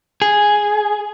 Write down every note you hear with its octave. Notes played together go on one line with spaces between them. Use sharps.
G#4